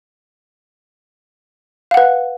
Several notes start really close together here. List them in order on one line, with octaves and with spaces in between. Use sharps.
F5 F#5 B4